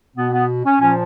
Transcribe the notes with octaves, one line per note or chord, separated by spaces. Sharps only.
B2 B3
B3
C#4
A#2 F3 C#4